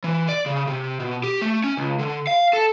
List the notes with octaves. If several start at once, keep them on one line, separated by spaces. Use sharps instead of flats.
E3
D5
C#3
C3
B2
G4
A3
C#4
C#2
D3
F5
A4